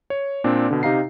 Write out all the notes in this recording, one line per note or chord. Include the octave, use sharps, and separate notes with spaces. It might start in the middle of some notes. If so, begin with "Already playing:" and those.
C#5
A#2 C4 D4
B2 D3
C3 D#4 G4 F5 A#5 C7